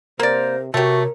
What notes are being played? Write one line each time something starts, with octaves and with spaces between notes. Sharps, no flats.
C3 A#3 A#4 C5 D5
C3 A3 F#4 G4 A#4 C#5